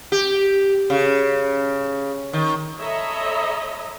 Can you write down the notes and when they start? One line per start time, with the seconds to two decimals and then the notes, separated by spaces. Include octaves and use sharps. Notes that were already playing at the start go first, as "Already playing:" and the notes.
0.12 G4
0.90 C#3
2.33 D#3
2.79 A4 C#5 D#5 E5 A#5 B5